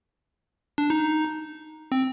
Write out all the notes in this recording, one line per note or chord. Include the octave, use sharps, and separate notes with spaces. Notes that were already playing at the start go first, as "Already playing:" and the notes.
D4
D#4
C4